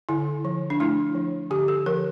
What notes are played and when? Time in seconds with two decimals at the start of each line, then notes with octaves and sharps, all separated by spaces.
0.09 D3 E4
0.45 F3
0.70 D4
0.80 A3 E4
1.15 F3
1.50 D3 G4
1.68 A4
1.86 F3 A#4